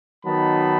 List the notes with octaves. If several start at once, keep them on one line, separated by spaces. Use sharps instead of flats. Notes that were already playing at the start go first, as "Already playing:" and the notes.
D#3 F#3 B3 D#4 A5 B5